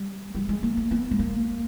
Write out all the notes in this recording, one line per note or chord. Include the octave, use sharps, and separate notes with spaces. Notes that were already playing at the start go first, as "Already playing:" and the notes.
Already playing: G3
G3
G#3
A#3
A#3
B3
G#3
A#3